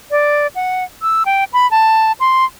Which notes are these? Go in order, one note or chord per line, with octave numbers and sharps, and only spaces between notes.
D5
F#5
E6
G5
B5
A5
C6